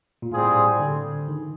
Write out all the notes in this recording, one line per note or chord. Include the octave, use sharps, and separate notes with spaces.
A#2
A2 G3 C4 F4 G#4
D3
D#3